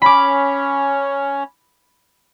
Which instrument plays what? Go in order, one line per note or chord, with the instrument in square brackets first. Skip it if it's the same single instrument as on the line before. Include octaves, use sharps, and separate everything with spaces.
[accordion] C#4 [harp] B5 D6